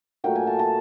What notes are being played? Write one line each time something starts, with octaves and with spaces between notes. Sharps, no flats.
A#2 F#3 A3 G5
G#5
A5
A5